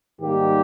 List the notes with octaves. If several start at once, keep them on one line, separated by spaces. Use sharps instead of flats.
G#2 D#3 G3 A#3 G4